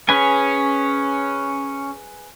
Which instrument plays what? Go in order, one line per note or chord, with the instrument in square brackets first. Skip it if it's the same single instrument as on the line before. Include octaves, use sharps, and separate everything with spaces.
[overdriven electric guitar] C#4 [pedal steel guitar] G#4 B4 G#5